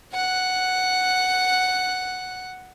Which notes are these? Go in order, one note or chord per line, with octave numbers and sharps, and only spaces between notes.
F#5 F#6